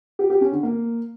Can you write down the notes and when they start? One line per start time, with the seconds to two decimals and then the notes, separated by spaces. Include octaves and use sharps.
0.19 G4
0.30 G4
0.41 C#4
0.52 D3
0.63 A#3